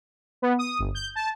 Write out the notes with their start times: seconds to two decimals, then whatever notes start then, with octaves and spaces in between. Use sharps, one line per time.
0.42 B3
0.59 D#6
0.79 G1
0.95 G6
1.15 A5